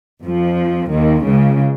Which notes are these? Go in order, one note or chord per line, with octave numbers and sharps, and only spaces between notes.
F2 F3
D#2 D#3
C#2 C#3